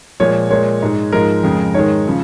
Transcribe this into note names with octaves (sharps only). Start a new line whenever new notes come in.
A#2 F3 G#3 C#5
A#2 G#3 C#5
G#2 G#3
G#2 F3 G#3 A#4
F2 C#3 G#3
G#2 D#3 G#3 C#5
C#3 F3